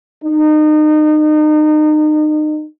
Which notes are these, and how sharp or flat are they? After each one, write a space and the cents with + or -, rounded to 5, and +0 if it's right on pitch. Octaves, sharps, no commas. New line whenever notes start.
D#4 -30